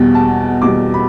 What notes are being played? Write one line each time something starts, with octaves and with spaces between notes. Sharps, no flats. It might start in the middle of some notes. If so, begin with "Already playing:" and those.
Already playing: E2 B2 G3
A5
E2 B2 G3 D6
B5